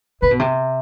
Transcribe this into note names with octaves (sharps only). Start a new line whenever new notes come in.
C3 B4
B2
C3